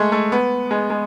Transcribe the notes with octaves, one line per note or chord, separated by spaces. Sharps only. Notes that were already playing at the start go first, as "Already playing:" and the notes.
Already playing: G#3 A3
A3
B3
G#3
G#3